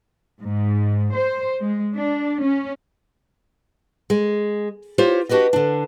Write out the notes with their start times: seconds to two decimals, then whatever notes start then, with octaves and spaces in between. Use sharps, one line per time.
0.42 G#2
1.15 C5
1.61 G#3
1.94 D4
2.42 C#4
4.10 G#3
4.98 F4 G4 C5 C#5
5.29 D4 F#4 G4 B4 D#5
5.53 D3 D4